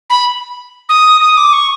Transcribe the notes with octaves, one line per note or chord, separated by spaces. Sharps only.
B5
D#6
D#6
D6
C#6